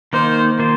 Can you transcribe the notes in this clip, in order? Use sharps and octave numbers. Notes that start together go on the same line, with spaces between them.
D#3 A#3 D#4 C5
D#3 A#3 F4 C5